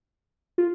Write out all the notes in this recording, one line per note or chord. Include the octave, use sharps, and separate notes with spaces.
F4